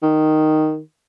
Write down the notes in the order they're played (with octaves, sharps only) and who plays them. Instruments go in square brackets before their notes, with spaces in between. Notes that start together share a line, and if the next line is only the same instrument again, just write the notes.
[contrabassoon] D#3